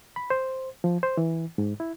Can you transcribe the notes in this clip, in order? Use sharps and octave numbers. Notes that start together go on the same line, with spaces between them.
B5
C5
F3
C5
E3
G#2
E4